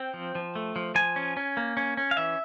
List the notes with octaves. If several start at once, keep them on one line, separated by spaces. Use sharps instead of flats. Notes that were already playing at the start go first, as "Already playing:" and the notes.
Already playing: C4 G5
F3
F3
A3
F3
F3 G#5
C#4
C#4
A#3
C#4
C#4
F5
E3 E5